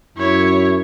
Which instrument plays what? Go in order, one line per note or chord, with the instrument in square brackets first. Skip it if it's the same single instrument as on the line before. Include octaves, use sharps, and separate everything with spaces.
[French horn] F#2 [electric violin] E4 C#5